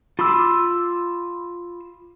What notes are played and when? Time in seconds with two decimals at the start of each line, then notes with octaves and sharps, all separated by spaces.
0.19 F4 B5 C6 D6 E6